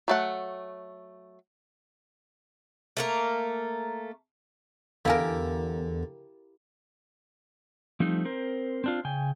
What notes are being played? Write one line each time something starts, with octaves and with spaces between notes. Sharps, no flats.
F#3 A3 F#5
A3 A#3 A#4
E2 D3 E4 G4 A#4 F5 G#5
F3 G3 A3 C4 D#4
C4 A#4 C5
C4 D4 F4
C#3 G5 G#5